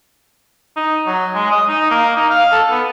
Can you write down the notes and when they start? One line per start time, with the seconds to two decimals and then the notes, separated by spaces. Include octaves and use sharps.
0.76 D#4
1.06 F#3
1.35 G#3
1.51 D#5
1.68 D#4
1.91 A#3
2.16 D#4
2.30 F5
2.52 A4
2.71 B3